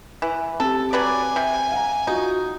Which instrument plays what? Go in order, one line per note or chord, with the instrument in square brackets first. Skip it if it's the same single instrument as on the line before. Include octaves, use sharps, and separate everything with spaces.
[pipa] E3
[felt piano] C4 G4 [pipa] A4
[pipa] F#3 B4 D5 [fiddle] G#5
[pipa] C3
[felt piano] F5 F#5 A#5
[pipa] D#4 [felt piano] F4 F#4